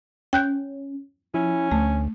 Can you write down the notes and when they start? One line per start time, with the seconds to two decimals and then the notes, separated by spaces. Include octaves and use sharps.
0.33 C#4 G5 F#6 G6
1.34 F3 C#4 E4
1.72 D2 A3